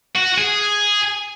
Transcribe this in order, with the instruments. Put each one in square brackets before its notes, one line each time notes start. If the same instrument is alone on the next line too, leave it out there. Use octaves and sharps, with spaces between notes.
[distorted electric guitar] F#4
G#4